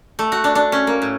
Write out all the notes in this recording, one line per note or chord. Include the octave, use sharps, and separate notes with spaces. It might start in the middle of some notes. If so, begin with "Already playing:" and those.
A3
F#4
D4
D4
C#4
A#3
A2